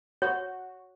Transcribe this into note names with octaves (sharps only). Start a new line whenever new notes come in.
F#4 C#5